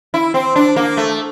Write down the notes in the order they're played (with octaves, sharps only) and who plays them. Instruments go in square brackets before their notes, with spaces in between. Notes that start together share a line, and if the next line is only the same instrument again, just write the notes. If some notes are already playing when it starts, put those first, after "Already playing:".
[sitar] E4
C4
D4
A#3
A3